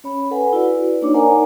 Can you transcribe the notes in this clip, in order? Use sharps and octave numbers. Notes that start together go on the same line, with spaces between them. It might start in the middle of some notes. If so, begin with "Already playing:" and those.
C#4 C#5 B5
A4 B4 F#5 G#5
E4 F#4 B4 D5
A#3 D4 D#4 C#5 D6
A#4 C5 D5 F#5 G#5 A#5